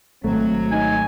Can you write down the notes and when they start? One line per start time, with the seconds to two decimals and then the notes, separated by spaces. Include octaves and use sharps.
0.24 G#1 F#3 A3 C4
0.71 D#4 G#5